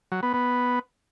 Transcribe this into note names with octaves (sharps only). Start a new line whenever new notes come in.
F#3
B3
B3